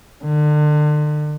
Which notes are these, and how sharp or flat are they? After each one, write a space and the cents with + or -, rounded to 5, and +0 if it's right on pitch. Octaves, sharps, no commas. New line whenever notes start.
D3 +35